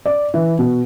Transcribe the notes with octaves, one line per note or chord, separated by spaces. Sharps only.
D5
E3
B2